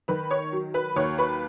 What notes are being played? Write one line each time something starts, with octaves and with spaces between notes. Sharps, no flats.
D#3 B4 B5
C#5 C#6
F#3
B4 B5
D#2 C#5 C#6
B4 B5